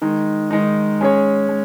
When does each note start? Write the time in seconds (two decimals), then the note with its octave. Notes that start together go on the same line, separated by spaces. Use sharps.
0.02 D#3 G#3 D#4
0.51 D#3 G#3 D#4
1.01 G#3 C#4 G#4 C#5
1.49 G#3